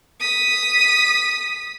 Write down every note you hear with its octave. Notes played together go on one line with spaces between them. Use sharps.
D#6 B6